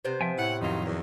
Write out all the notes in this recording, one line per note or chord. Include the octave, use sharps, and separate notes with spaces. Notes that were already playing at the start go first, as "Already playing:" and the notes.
C3 B3 C5
F3 E5 G5 G#5
A2 E4 F#5
F2 D#3 F#3 G3 D#4 F4
E2